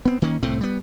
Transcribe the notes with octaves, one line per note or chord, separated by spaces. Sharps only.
B3 C4
D#3 A#3 C#4
C2 A2 A3 C4
G3 B3